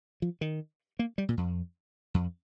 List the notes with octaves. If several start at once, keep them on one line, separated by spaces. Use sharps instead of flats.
F3
D#3
A#3
G3
A#2
F2
F2